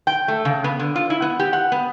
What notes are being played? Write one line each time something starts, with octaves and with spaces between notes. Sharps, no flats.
G5
A3
C#3
B3
D3
F4
E4
B3
G4
F#5
B3